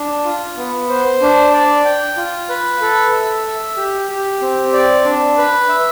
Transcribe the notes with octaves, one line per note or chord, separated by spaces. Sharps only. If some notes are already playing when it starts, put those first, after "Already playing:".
Already playing: D4
F4
B3
C5
D4
D5
G5
F4
B4
A4
E5
E5
G4
G4
C4
D5
D4
B4
E5